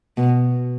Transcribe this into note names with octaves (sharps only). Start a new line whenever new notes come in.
B2